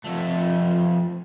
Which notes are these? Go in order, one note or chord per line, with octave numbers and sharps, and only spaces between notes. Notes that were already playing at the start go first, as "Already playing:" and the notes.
F2 A3